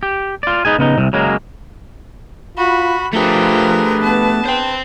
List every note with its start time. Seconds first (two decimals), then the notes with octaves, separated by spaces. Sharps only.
0.03 G4
0.43 F4 D5
0.65 B3 D#4 G#4 G#5
0.79 C#3 B3 D#4
0.98 C2 C3
1.13 C#3 F#3 G#3 A#3
2.57 F4 F#4 B5
3.13 F3 A3 D4 G4 G#4 A#4 B4
4.03 B3 A5
4.46 C5 G5